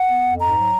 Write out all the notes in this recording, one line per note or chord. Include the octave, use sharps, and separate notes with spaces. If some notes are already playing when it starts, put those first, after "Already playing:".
Already playing: F#5
B3
F2
G#2 A#5
F#3